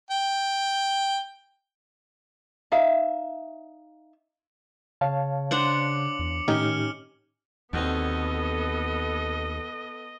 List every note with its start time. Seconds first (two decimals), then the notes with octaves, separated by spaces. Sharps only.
0.11 G5
2.72 D#4 E5 F5
5.01 C#3 C#5 F5 A5
5.51 D4 C5 F#5 D6 C#7 F#7
6.19 E2
6.48 A2 D#3 C#4 D#4 G4 F6 C#7 G7
7.73 D#2 B2 D3 B3 C4 A4 D#5